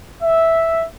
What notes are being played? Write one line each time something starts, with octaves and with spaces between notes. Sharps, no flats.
E5